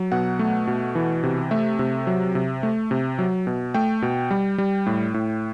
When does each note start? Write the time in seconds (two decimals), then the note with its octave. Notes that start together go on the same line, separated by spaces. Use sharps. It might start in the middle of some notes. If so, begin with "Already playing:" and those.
Already playing: F#3
0.12 B2 F#5
0.39 A3
0.67 B2
0.95 E3
1.23 C3
1.51 A3 E5
1.79 C3
2.07 F#3
2.35 C3
2.63 A3
2.91 C3
3.19 F#3
3.47 B2
3.74 A3 G5
4.02 B2
4.31 G3
4.58 G3
4.86 A2
5.14 A2